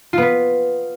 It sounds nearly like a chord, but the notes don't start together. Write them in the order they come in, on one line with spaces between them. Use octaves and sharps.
F4 B3 B4